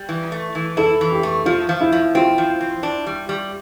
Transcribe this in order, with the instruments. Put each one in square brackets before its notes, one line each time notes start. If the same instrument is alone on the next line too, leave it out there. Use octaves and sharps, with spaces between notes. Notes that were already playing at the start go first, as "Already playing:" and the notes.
Already playing: [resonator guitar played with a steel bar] G3
E3
A3
E3
[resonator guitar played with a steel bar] E4 [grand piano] A4
[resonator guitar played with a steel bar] E3
[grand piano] G4
[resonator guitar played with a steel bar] A3
[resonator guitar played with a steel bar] F3 [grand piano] F4
[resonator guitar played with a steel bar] F3
[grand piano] E4
[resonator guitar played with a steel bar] F3
[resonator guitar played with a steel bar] C4 [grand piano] F4
[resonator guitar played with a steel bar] F3
C4
D4
G3
G3